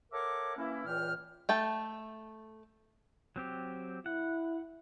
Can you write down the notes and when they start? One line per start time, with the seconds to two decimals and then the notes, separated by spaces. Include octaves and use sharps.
0.13 A4 A#4 C#5 E5 F#5 D6
0.58 E3 A#3 C#4 E4
0.86 C#2 A#2 E3 G5 F6
1.49 A3 G5 A5
3.36 F#3 C4 G4
4.06 E4 F#5